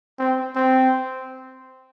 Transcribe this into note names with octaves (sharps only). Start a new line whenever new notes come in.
C4
C4